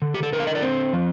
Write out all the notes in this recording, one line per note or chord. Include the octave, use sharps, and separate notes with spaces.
D3
G4
A4
D3 A#4
F5
D#5
D5
C4 C5
F3